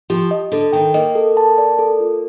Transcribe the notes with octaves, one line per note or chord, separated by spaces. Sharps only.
F3 G4
D#5
D3 A4
D#3 G5
A#3 D#5
A4
A5
D5
A4
F4